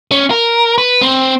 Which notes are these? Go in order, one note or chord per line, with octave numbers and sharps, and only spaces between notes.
C#4
A#4
B4
C4